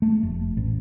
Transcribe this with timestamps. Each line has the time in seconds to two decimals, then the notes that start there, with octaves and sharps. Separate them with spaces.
0.02 A3
0.23 F1
0.57 A1